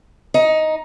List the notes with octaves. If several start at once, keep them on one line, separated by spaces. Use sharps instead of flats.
D#4